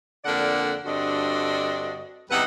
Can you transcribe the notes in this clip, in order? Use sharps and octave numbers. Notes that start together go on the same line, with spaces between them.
F2 D3 A#3 D4 D5 F#5
G2 D3 C4 D4 F#4 D#5
E2 C3 G3 D#4 B4 F#5